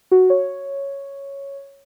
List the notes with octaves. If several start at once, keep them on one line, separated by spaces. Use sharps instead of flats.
F#4
C#5